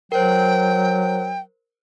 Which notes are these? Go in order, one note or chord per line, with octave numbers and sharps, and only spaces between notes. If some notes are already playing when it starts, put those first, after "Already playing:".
F#3 A#4 C5 G5